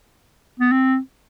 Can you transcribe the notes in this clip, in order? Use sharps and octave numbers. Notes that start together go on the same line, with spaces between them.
B3
C4